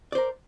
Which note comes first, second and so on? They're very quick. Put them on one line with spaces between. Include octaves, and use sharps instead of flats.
D5 C5 A#4